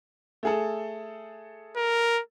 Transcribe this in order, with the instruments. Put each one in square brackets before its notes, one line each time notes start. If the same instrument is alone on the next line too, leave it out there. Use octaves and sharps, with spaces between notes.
[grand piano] A3 G#4 A4
[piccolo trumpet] A#4